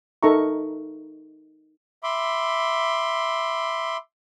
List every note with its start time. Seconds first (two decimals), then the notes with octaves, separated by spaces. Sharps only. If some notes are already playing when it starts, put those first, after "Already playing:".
0.23 D#4 A4 A#4 E5 A#5 C#6
2.03 E5 B5 C6 D6